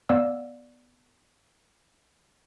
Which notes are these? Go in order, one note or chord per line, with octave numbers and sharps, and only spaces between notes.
B3 D5 F5 E6